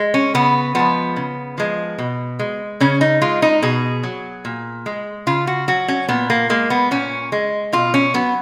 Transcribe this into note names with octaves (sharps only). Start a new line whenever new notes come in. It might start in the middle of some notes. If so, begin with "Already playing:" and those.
Already playing: G#3
C#4
C#3 B3
F3 G#3 B3
C#3
F3 G#3
B2
G#3
C#3 C#4
D#4
G#3 F4
D#4
B2 G#4
F#3
A#2
G#3
C#3 F4
F#4
F#3 F#4
C#4
A#2 B3
A#3
G#3 A#3
B3
A#2 C#4
G#3
B2 F4
C#4
F#3 B3